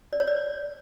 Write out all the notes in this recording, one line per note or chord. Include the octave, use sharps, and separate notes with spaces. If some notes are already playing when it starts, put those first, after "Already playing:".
D5
C#5
D5